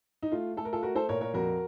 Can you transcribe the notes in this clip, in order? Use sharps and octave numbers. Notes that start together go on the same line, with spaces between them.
D#4
A3 F4
A3 A4
A#4
F4 A4
A3 F#4 A#4
A4 C5
A#2 A#4 C#5
A#4 C#5
F2 F#4 A#4